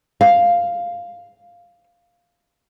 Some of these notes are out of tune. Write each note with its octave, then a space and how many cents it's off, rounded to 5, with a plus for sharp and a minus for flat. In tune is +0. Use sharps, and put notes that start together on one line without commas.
F5 +0